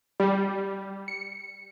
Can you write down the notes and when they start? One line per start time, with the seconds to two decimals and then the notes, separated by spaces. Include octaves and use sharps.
0.20 G3
1.08 C#7